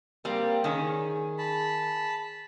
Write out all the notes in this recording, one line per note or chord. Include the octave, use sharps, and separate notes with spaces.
G3 A#3 C4
D#3 C#4 G#4
A5 B5